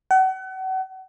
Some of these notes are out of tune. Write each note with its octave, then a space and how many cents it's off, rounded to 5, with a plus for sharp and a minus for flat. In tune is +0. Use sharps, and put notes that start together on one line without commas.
F#5 +35